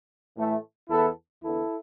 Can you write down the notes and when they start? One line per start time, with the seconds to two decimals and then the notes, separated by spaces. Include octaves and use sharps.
0.36 A2 E3 A3
0.90 E2 E3 B3 E4 A4
1.43 E2 D3 B3 E4 A4